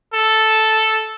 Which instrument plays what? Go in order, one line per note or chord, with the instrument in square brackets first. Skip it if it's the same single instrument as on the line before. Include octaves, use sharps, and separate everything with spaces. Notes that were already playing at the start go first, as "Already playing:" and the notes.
[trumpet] A4